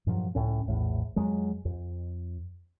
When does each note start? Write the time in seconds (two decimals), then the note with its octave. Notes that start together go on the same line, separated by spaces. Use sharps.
0.07 G2 A#2 F3 F#3
0.35 C#2 A2 C#4
0.68 A#1 E2 A2
1.16 F2 F#3 G#3
1.65 F2